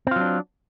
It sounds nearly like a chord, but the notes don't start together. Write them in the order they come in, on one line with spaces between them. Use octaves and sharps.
C4 F4 F#3 D4